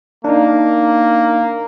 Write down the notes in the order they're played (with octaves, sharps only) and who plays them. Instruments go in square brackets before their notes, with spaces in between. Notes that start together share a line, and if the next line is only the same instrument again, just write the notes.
[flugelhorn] A#3 [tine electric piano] D4 D#4